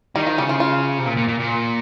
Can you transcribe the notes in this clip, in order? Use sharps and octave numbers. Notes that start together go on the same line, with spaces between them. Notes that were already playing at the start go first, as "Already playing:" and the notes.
D#3 G3
F3
C#3 G3
F4
F4
C3
A#2
A#2
A#2
A#2